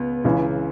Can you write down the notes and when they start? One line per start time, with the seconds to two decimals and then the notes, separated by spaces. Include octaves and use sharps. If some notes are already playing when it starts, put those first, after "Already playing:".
Already playing: C#2 B3
0.24 C#2 C#3 E3